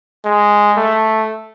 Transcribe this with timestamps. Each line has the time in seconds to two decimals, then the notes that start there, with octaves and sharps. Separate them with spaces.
0.25 G#3
0.76 A3